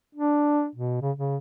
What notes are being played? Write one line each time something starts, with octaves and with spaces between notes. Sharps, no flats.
D4
B2
C#3
C#3